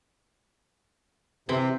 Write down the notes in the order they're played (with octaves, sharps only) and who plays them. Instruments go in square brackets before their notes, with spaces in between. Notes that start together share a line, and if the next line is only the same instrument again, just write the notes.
[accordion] C3 [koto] E3 C4